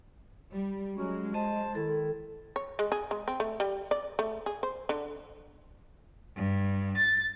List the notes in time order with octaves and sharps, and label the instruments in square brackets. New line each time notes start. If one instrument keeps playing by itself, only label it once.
[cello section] G3
[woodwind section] F#3 C#4 F#4 [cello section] G#3
[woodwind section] C5 A5 [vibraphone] D#5
[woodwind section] D#3 E4 [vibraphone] A4
[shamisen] C#5
G#3
G#4
G#3
C4
A3
G3
D5
A3
G#4
C5
D3
[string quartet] G2
A6